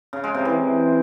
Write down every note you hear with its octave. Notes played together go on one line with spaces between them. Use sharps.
C#3
G#3
C3
E3